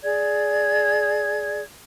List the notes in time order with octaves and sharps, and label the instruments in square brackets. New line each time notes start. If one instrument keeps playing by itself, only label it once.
[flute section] G#4 D5 G#6